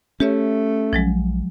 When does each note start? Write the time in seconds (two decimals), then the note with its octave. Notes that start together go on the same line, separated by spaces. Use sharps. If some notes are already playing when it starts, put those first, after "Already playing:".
0.20 A3 C#4 G4 C#5 E5
0.93 A#1 F3 F#3 G#3